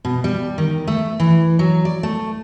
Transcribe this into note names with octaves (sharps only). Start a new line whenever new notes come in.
B2
G3
D#3
A3
E3
F#3
D5
A3